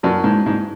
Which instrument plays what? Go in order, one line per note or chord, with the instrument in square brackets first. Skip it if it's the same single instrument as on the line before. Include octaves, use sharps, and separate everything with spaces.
[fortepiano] F#2 [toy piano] E4 B4 D5 A5 C#6
[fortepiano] G#2
G#2